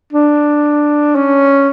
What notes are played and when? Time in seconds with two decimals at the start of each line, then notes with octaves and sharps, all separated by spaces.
0.13 D4
1.16 C#4